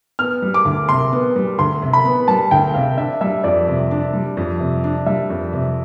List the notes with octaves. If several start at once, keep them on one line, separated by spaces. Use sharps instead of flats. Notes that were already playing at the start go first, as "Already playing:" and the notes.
B3 F6
G3
D6
D2
C3 C6
B3
G3
D2 C6
C3
B5
B3
G3 A5
D2 G5
C3 F5
D4 E5
G3 E5
F2 D5
C3
D4
G3
F2
C3
D4
G3 E5
F2
C3